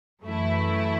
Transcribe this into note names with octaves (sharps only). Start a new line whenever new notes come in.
F#2 E3 A3 E4